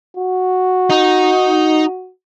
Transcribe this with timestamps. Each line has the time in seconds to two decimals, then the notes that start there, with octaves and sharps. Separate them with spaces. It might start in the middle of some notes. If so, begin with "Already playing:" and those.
0.17 F#4
0.90 D#4